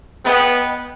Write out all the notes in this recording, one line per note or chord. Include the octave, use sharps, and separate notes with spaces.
B3 B4 D#5 G5